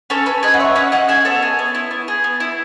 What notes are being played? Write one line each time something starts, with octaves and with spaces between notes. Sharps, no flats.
C#4 A4 C#5
C#4 B4
G#4 B4 D#5
F#5
G#4 C#5 E5
C#4 D#5 F#5
C#4 D#5 F#5
G#4 E5 G#5
B3 A4 C#5
G#4
B3
E4
B3
G#4
B3
E4